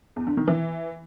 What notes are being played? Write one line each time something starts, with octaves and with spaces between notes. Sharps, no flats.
E2
D3
D#3
E3